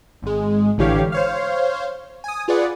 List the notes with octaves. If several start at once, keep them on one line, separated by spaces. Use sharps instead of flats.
G#1 G#3
A1 D3 E3 G4 C#5 F5
C5 C#5 F5
G#5 D#6
F4 G#4 B4 D5 F#5